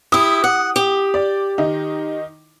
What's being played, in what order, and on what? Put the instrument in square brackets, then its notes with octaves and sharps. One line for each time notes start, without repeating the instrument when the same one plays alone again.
[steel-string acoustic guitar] E4 G4 [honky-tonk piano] D#6
[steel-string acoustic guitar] F#5
G4
[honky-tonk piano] D5
D#3 D#4